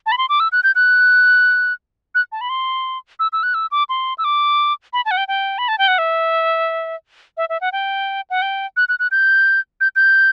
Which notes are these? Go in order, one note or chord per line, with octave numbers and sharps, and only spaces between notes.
A5
B5
C6
D6
E6
F#6
G6
F#6
F#6
A5
B5
C6
E6
E6
F#6
E6
D6
C6
E6
D6
B5
A5
F#5
G5
G5
B5
A5
G5
F#5
E5
E5
E5
F#5
G5
F#5
G5
F#6
F#6
F#6
G6
G6
G6